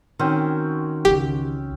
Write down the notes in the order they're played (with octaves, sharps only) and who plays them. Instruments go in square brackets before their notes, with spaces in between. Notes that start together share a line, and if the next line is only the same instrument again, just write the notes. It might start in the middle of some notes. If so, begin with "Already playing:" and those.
[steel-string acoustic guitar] D#3 [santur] C4 C#4 F#4
[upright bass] C#2 E3 [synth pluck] G4